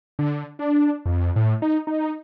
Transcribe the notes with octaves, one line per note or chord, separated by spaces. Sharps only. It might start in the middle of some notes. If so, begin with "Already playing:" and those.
D3
D4
F2
A2
D#4
D#4